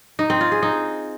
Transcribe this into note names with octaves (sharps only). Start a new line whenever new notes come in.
D#4
C4
F4
G#4
D#4